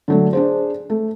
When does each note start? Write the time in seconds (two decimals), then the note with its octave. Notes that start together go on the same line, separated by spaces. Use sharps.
0.08 D3 F#3 A3
0.33 D4 G#4 C5
0.90 A3